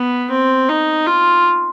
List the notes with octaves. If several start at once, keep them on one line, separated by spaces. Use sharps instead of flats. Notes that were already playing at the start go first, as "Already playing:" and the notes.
Already playing: B3
C4
D#4
F4